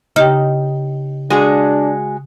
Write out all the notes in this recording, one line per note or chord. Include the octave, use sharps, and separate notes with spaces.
C#3 D#4 G4 G5
G#3 D4 F#4 G#4